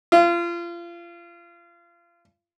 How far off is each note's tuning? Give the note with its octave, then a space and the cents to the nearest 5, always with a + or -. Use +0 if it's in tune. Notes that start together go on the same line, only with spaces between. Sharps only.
F4 -30